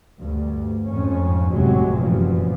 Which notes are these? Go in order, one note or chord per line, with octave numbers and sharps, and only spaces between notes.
D2 G2
F2 G#2 F3 C#4
F1 D#2 A2 C3 F#3 G#3
F#2 A#2 E3 F3